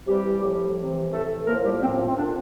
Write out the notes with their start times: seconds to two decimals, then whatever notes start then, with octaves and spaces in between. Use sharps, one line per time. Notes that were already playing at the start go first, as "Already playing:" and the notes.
0.07 C3 E3 G3 G4
0.41 A2 F3
0.77 C3 E3
1.12 A2 E3 A3 A4
1.47 F3 A#3 A#4
1.50 A2
1.65 G3 G4
1.82 F3 C4
1.87 A2
1.95 C4
2.06 C4
2.17 A#2 D3 F3 D4